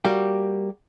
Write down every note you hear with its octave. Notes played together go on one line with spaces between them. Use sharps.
G3 A#3 F#4 G4